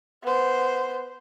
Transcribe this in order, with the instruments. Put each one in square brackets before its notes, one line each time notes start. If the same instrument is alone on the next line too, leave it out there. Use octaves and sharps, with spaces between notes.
[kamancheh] B3 C5